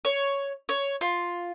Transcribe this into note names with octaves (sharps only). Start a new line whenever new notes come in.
C#5
C#5
F4